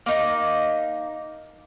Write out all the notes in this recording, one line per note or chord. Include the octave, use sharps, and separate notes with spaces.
A#3 D#4 A#5